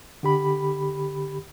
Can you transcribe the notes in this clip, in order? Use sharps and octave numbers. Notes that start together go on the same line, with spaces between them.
D3 G4 B5